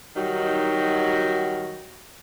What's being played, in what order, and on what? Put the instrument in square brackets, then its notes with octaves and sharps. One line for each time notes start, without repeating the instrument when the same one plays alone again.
[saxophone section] D#3 F#3 G3 D#4 F#4